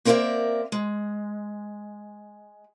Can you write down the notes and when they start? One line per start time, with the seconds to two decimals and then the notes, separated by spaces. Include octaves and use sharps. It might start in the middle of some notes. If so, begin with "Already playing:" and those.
0.05 A#3 C4 A#4 C#5 D5 E5
0.72 G#3